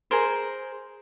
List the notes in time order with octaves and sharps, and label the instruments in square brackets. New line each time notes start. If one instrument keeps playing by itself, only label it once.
[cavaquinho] G#4 A#4 C5